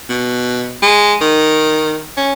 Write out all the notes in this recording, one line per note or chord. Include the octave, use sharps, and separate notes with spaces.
B2
G#3
D#3
C#4